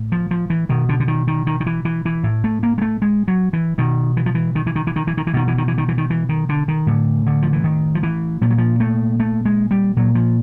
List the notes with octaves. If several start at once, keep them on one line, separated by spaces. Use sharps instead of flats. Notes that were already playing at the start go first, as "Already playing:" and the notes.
Already playing: A2
F3
F3
E3
B2 D#3
D3
D3
D#3
D#3
D#3
D#3
E3
E3
E3
A2
A3
A#3
G#3
A3
G#3
F#3
E3
B2 D#3
E3
F3
E3
D#3
E3
D#3
E3
D#3
E3
D#3
E3
B2 D#3
E3
D#3
E3
D#3
E3
D#3
E3
D#3
D3
D#3
A2 D3
D3
F3
E3
D#3
F3
E3
A#2 F3
F#3
F3
A3
A3
G#3
G3
A#2 F#3
F3